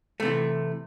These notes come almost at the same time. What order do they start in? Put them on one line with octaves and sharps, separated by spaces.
A3 C3 E3